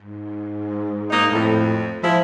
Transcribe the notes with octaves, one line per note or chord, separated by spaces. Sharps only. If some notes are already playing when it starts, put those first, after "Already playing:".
G#2
A#3 D#4
F2 A2
F3 G#3 E4